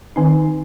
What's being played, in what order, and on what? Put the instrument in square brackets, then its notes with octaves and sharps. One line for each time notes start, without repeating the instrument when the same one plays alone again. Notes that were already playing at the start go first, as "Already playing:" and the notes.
[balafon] D#3 C4 D#4